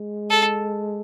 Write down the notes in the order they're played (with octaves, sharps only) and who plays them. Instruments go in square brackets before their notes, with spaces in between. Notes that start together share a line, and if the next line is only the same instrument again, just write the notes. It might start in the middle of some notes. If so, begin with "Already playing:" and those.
Already playing: [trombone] G#3
[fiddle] A4